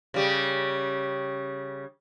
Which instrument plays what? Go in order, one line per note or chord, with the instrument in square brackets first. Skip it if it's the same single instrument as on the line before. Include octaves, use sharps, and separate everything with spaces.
[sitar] C#3 G3